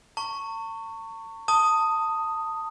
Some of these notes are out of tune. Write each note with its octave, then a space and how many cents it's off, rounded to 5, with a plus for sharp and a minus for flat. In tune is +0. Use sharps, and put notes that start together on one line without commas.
A5 +45 C#6 +0
A5 +25 D#6 +0